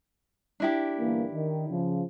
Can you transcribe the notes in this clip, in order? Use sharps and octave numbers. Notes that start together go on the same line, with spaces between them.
D4 E4 G4
G1 E3 A#3
D#3
C#3 F3